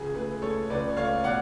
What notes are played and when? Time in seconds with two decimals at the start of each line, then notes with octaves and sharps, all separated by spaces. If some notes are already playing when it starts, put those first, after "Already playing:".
Already playing: C#2 G#4
0.15 A3 G#4 B4
0.42 A3 A4 C#5
0.70 C#2 B4 D5
0.97 A3 C#5 F5
1.24 B2 D5 F#5